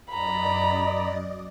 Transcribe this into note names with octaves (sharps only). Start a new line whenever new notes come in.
F#2 D5 D#5 A#5 B5